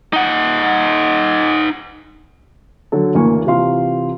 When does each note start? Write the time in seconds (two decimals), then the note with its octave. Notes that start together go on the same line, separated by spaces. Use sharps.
0.13 D#4 F#5
2.92 D3 F#3 A4
3.15 F#1 D2 E3 A#3 G#5 C#6
3.46 C3 E3 F4 F5 C6